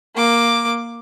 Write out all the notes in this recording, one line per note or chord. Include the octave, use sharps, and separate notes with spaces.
A#3 D6